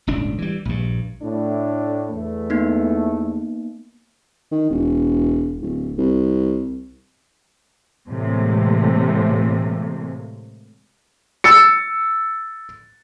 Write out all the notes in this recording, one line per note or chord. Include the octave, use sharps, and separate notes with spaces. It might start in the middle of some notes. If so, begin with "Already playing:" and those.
D#1 G#1 C#2 D4
E3 G3
A#1 G2
A2 D4
E2 A3
A#3 B3 D#4
D#3
E1
D1
C2
A2 C3 E3 G#3 A#3
E6 A6 C#7